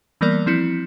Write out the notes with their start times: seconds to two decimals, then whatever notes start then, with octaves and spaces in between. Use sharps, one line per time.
0.21 E3 G3 A#3 B3 A#4 D5
0.46 F3 C4 E4 C#7